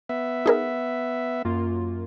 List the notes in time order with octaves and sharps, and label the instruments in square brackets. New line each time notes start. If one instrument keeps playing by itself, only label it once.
[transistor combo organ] B3 E5
[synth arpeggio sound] D#4 G#4 A#4
[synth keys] F#2 A#3 F4